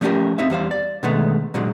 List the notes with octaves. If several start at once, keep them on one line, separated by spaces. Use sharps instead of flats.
F3 A3 C#4 D#4 G4 A#4
C4 D#4 E5 F5
E2 G3 C5 F5
D5
B2 D3 D#3 G#3 A3 B3
A#2 D3 F#3 G#3